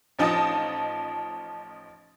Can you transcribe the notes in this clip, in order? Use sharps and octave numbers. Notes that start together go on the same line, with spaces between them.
A1 F3 D#4 D#5 A5 D#6